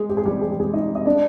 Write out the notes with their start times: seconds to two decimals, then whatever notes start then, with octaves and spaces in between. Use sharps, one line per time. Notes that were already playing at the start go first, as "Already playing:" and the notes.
Already playing: G#3 G#4
0.09 G4
0.17 G#4
0.25 G3 G4
0.41 G#4
0.51 G4
0.60 G#3 G#4
0.74 D#4 D#5
0.95 D#5
1.06 D4 D5